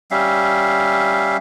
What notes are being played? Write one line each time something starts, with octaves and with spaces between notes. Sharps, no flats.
G3 C#4 E5 F5